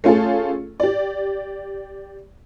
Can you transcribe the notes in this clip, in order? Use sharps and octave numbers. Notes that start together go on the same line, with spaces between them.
A3 C#4 F4 G#4 A4
G4 D5